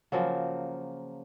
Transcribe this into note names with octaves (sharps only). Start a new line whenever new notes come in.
C#3 F3 F#3 A#3